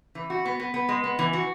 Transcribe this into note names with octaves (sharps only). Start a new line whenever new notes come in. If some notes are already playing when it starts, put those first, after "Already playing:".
E3
F#4
B3
B3
B3
G#3
B3
E3
F#4